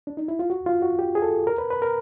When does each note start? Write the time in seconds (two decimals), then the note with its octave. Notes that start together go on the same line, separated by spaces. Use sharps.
0.07 D4
0.17 D#4
0.28 E4
0.39 F4
0.50 F#4
0.66 F4
0.82 F#4
0.99 G4
1.15 G#4
1.22 A4
1.47 A#4
1.58 B4
1.71 B4
1.82 A#4